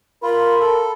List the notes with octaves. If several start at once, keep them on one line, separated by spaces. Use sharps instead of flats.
F4 A#4 B5
A4